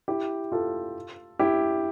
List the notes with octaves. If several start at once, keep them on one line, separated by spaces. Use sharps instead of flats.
E4 G4
F4 A4
E4 G4